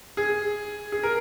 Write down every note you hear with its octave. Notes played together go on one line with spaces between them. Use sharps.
G#4
G#4
A#4